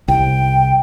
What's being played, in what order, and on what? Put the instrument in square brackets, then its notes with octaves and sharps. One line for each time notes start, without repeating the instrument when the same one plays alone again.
[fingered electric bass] C2 [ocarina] G5